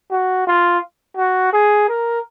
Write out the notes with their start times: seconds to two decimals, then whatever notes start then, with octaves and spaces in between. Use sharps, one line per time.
0.11 F#4
0.47 F4
1.17 F#4
1.53 G#4
1.89 A#4